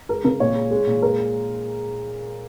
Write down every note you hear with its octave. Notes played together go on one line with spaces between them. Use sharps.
G#3 A#4
C#3 A#4
A#2 C#5
G#3
G#3
A#2
G#3 A#4